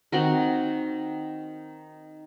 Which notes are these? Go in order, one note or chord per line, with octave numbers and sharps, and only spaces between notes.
D#3 C4 F#4 A#4